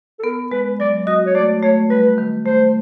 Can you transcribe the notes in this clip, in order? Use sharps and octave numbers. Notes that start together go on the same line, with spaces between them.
A4
B3 A#4
G#3 B4
F#3 D5
F#4 D#5
C#5
A3 D5
A3 C#5
G3 B4
D#3
A3 C5